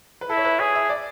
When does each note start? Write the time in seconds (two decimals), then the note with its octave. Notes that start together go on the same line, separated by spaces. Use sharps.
0.21 B4
0.30 E4 A4
0.37 C#5
0.45 B4
0.59 G#4 C#5
0.75 E5
0.89 D5